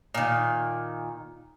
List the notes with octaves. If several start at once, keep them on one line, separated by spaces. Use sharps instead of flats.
A#2 D#3